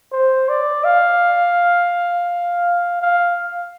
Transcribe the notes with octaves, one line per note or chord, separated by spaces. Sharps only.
C5
D5
F5
F5